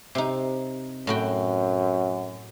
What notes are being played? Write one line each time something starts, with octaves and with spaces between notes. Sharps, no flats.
C3 D#4
F#2 A2 F#4 G5